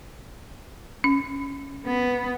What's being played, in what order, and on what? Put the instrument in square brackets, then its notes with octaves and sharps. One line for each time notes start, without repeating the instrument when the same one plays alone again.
[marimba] C#4
[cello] B3